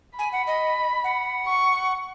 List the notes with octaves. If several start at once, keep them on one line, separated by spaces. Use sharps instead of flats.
G#5 B5
F#5
D#5
F#5
C#6